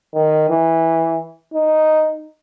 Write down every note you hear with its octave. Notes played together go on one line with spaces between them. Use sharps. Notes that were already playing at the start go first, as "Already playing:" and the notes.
D#3
E3
D#4